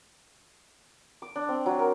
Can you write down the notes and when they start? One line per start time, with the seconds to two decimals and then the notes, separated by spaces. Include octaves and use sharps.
1.22 D6
1.36 D4
1.49 C4
1.66 F#3
1.79 A#4